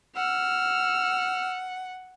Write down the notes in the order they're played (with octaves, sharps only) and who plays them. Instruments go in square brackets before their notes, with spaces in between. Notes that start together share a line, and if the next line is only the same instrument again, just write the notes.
[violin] F#5 [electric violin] E6 F6